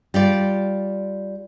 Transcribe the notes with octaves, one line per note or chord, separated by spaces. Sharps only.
G3 F4 D5